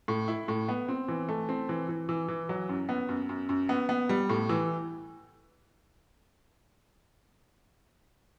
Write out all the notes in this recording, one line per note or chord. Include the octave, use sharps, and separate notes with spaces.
A2
E4
A2
B3
C4
E3
A3
C4
E3
E3
E3
E3
F#3
F#2
B3
F#2
F#2
F#2
B3
B3
G3
A2
E3